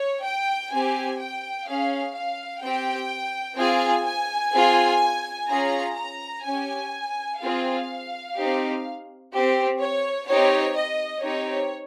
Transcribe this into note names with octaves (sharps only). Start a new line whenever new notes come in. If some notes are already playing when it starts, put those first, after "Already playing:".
Already playing: C#5
G5
C4 G4 G#5
G5
C#4 G#4 F5
F5
C4 G4 G5
C4 F4 G#4 G#5
G#5
C4 F4 G#4
C#4 F4 G#4 A#5
A#5
C#4 G4 G#5
C4 F4 G#4 F5
C4 D#4 G4
C4 G4
C#5
C4 D#4 G4 C#5
D#5
C4 D#4 G4 C#5